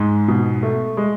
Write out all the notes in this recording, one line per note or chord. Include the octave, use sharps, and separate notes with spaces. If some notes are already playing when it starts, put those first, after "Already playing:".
Already playing: G#2 G#3
B2
A3
G#3